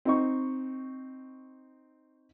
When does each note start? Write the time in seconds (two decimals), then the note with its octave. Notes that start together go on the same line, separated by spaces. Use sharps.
0.05 C4 D#4 C#6